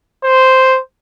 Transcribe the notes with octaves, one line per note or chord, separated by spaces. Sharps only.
C5